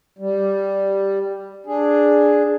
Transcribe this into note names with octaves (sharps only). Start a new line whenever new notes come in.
G3
D4 G#4